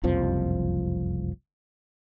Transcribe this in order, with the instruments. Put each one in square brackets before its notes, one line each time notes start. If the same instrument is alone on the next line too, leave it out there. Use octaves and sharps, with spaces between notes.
[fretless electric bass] F#1 C2 F2 F3